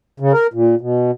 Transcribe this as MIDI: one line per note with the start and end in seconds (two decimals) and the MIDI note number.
0.20 0.32 49
0.33 0.47 70
0.54 0.75 46
0.81 1.11 47